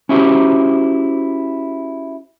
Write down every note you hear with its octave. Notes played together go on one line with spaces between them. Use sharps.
C#4 E4 F#4 G4 C5